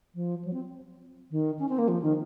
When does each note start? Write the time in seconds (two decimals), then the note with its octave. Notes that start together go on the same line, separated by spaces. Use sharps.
0.15 F3
0.45 F#3
0.53 C4
1.31 D#3
1.59 C#4
1.69 C4
1.78 A#3
1.88 F3
2.02 D#3